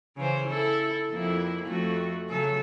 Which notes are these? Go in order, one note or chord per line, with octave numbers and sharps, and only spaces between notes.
C#3 E3 C5
E4 A4
F2 A#3 E4
F2 A3 F#4
C#3 F#3 A4